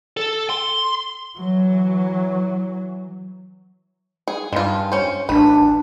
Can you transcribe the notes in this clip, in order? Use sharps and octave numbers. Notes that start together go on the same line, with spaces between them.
A4
C6
E3 F#3
G#4
G2 G#3 F4
C#4 C5
A1 D4 B4